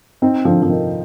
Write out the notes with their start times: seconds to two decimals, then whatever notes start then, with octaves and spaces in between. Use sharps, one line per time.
0.22 C4 D#4
0.45 D3 F3
0.63 F3
0.69 C3 D#3